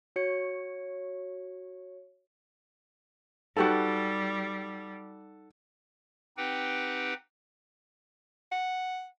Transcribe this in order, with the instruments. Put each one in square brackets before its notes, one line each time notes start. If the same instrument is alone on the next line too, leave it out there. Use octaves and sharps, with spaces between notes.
[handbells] F#4 C#5 C#7
[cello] G3 [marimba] D#4 [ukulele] F#4 G4 B4 [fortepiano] A4 F#5
[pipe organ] C4 D#4 G4 B4 F#5 G5
[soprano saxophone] F#5